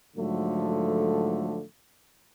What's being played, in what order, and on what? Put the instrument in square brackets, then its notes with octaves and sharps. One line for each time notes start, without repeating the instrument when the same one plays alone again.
[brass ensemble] G#2 D3 F3 F#3 A3